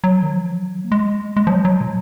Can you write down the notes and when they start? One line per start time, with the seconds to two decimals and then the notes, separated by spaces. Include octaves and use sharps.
0.04 F#3
0.23 D#3
0.34 F3
0.48 F#3
0.85 A#3
0.92 G#3
1.37 G#3
1.47 F3
1.50 F#3
1.65 F#3
1.81 A#2